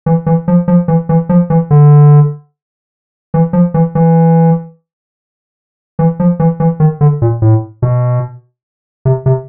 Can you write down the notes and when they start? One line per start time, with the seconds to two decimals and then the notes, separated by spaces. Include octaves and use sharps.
0.06 E3
0.26 E3
0.48 F3
0.68 F3
0.88 E3
1.09 E3
1.29 F3
1.50 E3
1.71 D3
3.34 E3
3.53 F3
3.74 E3
3.95 E3
5.99 E3
6.20 F3
6.40 E3
6.60 E3
6.80 D#3
7.01 D3
7.22 A#2
7.42 A2
7.82 B2
9.05 C3
9.26 C3